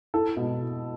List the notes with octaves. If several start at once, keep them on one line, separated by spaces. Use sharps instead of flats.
E4 A4
B2